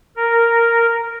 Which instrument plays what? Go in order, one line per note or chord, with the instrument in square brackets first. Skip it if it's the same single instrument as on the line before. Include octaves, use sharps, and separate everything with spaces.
[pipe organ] A#4